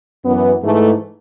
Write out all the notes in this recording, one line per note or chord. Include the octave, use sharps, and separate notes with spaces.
F#2 E3 B3
G#2 E3 A3